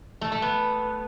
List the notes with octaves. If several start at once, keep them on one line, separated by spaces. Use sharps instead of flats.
A3
A3
B3